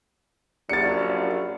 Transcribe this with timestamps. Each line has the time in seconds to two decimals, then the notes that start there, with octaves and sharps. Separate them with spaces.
0.69 A#1 F#2 A#3 G4 D5 A6 C#7